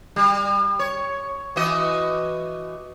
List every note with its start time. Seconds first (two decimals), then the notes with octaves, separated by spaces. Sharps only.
0.16 G3
0.79 C#5
1.56 E3 F#4 D#5